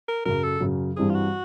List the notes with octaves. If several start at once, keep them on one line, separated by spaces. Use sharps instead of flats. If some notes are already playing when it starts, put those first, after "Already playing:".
A#4
F#2 C#3 F#3 A#4
A4
F#2 C#3 F#3
G2 E3 G3 C4 G#4
F4
F#4